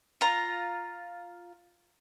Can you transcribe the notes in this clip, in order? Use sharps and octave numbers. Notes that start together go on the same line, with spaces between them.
F4 A#5